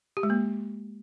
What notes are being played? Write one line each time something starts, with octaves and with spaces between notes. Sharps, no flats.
G4
G#3
A#3